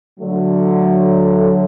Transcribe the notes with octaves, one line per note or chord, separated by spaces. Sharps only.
D3 F#3 A3